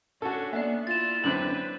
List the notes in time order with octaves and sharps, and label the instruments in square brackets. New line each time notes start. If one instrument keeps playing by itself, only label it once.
[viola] C#4 D4 [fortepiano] F#4 A4
[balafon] A#3 D5 [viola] B3 [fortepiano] E5
[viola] E4 F4 [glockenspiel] A6 E7
[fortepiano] F#2 D3 C4 [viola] B4 [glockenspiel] F#7